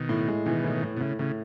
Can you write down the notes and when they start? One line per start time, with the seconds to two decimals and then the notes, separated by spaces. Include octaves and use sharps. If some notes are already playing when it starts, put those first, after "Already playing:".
Already playing: B2 D#3
0.09 A2
0.28 G#3
0.46 B2 D#3 E3
0.64 A2
0.83 A2
0.97 B2
1.01 A2 C#3
1.19 A2 C#3